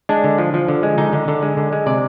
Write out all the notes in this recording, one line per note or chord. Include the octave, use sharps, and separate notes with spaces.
G#3 D4
D3
F3
F3
D3
G#3
D3 D#4
D3
D3
G#3
D3
G#3
C3 D5